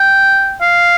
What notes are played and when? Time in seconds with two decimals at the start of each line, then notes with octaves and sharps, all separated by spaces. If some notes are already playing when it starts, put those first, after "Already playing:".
Already playing: G5
0.61 F5